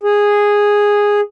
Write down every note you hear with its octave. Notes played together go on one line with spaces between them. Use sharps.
G#4